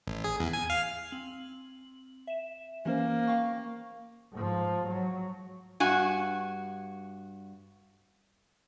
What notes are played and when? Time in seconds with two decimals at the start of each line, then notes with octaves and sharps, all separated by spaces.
0.07 A1
0.24 G#4
0.39 E2
0.53 G#5
0.70 F5
1.12 C4 F#7
2.27 E5 E7
2.85 E3 A#3 C#4 C5
3.28 F5 G5 C#6
4.33 G#2 F3
4.87 F#3
5.80 G2 F#4 G#5